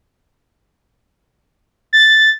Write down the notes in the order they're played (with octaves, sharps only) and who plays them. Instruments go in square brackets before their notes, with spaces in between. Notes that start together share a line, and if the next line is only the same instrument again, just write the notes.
[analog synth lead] A6